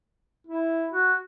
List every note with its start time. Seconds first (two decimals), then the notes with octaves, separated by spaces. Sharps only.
0.47 E4
0.92 F#4